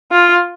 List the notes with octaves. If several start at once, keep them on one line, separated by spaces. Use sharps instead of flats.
F4